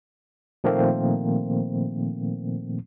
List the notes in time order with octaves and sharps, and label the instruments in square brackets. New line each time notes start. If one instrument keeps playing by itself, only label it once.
[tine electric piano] A#2 D#3 F3 A3 A#3 C4